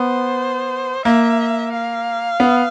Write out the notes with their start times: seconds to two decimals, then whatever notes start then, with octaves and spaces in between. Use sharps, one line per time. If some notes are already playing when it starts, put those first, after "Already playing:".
Already playing: B3 C5
1.05 A#3 E5
1.72 F5
2.40 B3